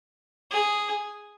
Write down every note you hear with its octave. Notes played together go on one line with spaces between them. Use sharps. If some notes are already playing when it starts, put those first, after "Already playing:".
G#4